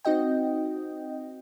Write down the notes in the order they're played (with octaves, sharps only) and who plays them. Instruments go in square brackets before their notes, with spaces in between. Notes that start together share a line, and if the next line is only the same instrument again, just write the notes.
[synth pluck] C4 D#4 F#4 D#5 G5